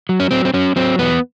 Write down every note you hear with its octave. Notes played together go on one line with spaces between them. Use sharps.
F#3
C#4
F#3 C4
C4
F#3 C#4
F#3 C4
E2 B3